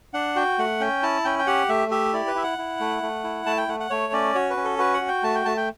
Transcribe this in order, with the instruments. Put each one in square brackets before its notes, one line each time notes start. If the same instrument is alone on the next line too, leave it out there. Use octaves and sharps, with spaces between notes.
[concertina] D4 F#5
F#4 G5
A3 F#5
C#4 G5
E4 A5
C#4 G5
G5
G4 F#5
A3 E5
G4 E5
E4 D5
B4
E4 E5
F#5
E4
A3
A3
E4
A3 A5
G5
A3 F#5
F#5
A3 C#5
C#4 D5
F#4 C#5
B4
C#4
A4
F#4 B4
F#5
F#4
G5
A3 A5
G5
A3 A5
G5